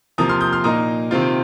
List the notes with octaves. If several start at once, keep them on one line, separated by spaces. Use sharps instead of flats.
C3 F3 A#3 A#5 D#6
C6 F6
D#6 G6
C6 F6
A#2 A#3 D#4 A#5 D#6
C3 D#3 C4 F4